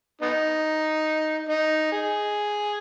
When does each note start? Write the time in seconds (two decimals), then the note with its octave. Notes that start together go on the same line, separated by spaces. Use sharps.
0.22 B3 D#4
1.49 D#4
1.92 G#4